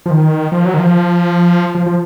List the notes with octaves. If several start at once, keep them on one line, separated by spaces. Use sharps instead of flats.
F3
D#3
F3
F#3
D#3
F3
F3
F3